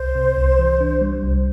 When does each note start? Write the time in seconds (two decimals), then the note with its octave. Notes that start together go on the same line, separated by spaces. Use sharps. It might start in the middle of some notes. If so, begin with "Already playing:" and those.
Already playing: C2 C5
0.15 C3
0.37 C2
0.59 E3
0.80 D4
1.01 G3
1.24 C2